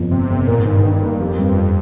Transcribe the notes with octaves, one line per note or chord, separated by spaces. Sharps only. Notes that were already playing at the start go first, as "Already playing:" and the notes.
Already playing: G1 F2
G1 C3
G1
A#2 A#4
G#2
D#3
G2
G#2
G2 D#3
A#3
F2 G4
G2